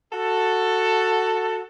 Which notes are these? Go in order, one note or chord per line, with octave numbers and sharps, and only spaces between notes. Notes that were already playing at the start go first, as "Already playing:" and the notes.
F#4 A4